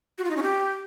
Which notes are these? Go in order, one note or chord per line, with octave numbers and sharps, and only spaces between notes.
F#4
F4
D#4
C#4
G4